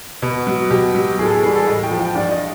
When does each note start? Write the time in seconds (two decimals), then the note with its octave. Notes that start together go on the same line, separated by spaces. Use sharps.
0.22 B2
0.47 F#3
0.71 B2 G4
0.95 F#3
1.19 A2 G#4
1.26 A4
1.31 G#4
1.43 E3 G3 G#4
1.55 A4
1.67 A2 D#5
1.83 G5
1.91 F3
1.99 G5
2.15 G2 D5
2.27 D5
2.31 D#5